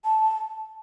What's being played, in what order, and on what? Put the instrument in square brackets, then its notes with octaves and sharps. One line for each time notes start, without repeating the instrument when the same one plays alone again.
[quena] A5